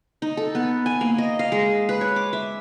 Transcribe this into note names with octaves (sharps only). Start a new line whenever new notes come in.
D#4
A4
B3
G#5
A#3
D#5
F5
G#3
B4
C#5
D6
E5